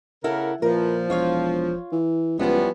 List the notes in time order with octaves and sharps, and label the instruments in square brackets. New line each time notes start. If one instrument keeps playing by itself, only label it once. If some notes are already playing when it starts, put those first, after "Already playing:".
[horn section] C#3 A#4 [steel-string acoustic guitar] E4 A4 F#5
[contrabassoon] A#2 [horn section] F3 [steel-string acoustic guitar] A#4 B4
[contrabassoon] E1 [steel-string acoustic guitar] F4 C#5 F5
[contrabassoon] E3
[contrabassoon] C#2 [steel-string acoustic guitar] E3 C#4 [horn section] F3 G3 B3